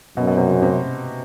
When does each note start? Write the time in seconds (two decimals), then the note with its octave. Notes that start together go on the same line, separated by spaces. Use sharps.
0.17 F#2 B2
0.27 B2
0.37 C3
0.47 C#3
0.62 C3